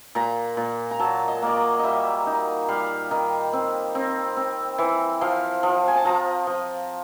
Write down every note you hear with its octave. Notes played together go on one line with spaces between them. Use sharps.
A#2 A#5
A#2
A#5
F#3 A5
D#5
A#3 D5
D#5
G3 D#5 E5
D#4
G3 F5
D#3
C4
C4
C4
E3
F3 F5
F3
G#5
A5
F3 A#5
F3